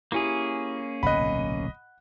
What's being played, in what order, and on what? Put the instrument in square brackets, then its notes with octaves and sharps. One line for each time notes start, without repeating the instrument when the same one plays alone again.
[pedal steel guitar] A#3 C#4 G#4 [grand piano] E4 G4 G#5
[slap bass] D1 B1 C3 [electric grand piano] D#5 B5 [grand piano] F#5 F#6